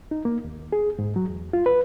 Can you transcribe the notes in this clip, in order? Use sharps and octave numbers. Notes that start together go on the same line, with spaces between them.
D#4
A#3
D#2
G#4
G#2
F#3
E2
F4
B4